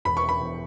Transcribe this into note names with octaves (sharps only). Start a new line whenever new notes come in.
E1 B5
C#6
B5
E2